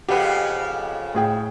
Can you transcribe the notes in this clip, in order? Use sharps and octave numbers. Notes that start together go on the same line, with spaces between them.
F2 C#3 B3 G4
A2 G#4 G5